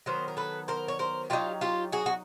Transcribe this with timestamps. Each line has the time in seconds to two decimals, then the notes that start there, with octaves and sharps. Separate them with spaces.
0.06 D#3 F#3 B3 A#4 C5
0.28 A#4
0.37 A4 B4
0.68 A#4 C5
0.88 C#5
0.99 A#4 C5
1.30 F#3 B3 D#4 F4 G4
1.61 F4 G4
1.92 F#4 G#4
2.06 F#4